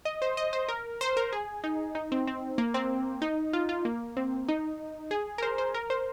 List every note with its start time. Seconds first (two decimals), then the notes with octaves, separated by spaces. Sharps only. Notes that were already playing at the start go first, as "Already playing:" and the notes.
0.05 D#5
0.22 C5
0.37 D#5
0.53 C5
0.68 A#4
1.01 C5
1.17 A#4
1.32 G#4
1.64 D#4
1.95 D#4
2.12 C4
2.27 C4
2.58 A#3
2.74 C4
3.22 D#4
3.53 F4
3.69 F4
3.85 A#3
4.17 C4
4.48 D#4
5.11 G#4
5.38 A#4
5.42 C5
5.58 C5
5.74 A#4
5.90 C5